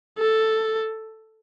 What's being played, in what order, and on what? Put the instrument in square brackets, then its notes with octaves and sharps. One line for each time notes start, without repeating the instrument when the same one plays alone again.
[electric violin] A4